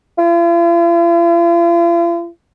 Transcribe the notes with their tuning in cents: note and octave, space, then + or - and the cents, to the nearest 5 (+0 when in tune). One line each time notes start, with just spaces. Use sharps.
F4 -45